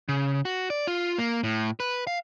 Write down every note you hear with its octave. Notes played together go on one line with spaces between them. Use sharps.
C#3
F#4
D5
F4
A#3
A2
B4
F5